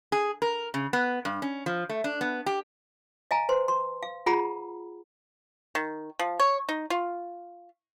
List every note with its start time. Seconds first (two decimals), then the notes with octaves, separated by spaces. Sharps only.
0.12 G#4
0.42 A#4
0.74 C#3
0.93 B3
1.25 G2
1.42 C#4
1.66 F3
1.89 A3
2.04 D4
2.21 B3
2.46 G4
3.31 D#5 F5 G#5 A#5
3.49 B4 C5 C6
3.68 C6
4.03 F5
4.26 F4 G#4 F#5 A#5 B5
5.75 D#3
6.19 F3
6.40 C#5
6.69 D#4
6.90 F4